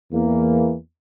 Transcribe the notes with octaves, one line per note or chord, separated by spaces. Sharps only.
E2 E3 A#3